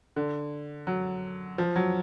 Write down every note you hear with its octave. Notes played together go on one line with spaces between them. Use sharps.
D3
F#3
F3
F#3